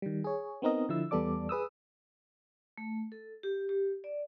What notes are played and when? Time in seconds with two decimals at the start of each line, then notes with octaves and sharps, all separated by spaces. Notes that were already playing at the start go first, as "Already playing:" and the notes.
0.02 D#3 G3
0.24 G#4 C#5
0.62 B3 C4 D#4 A#4 D#5
0.89 D3 F3 E4 E6
1.11 E2 G3 B3 A4 D5 D6
1.49 G#4 B4 D#6 E6
2.78 A3
3.12 A4
3.43 G4
3.69 G4
4.04 D5